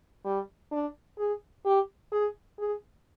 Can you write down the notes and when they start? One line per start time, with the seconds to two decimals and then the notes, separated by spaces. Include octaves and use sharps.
0.25 G3
0.72 D4
1.18 G#4
1.65 G4
2.12 G#4
2.59 G#4